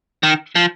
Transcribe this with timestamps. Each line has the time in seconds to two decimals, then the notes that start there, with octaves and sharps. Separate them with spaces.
0.23 D#3
0.55 F3